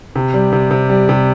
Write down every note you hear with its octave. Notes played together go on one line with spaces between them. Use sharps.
C3
G3
C3
C3
G3
C3